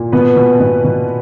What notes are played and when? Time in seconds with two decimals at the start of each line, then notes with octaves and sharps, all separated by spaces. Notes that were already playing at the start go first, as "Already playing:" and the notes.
Already playing: A#2
0.12 B2 B3 B4
0.36 B2
0.60 B2
0.84 B2